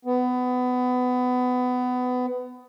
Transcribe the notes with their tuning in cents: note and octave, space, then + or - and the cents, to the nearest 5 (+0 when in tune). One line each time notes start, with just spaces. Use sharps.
B3 +20